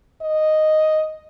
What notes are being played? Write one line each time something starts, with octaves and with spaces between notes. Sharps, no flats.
D#5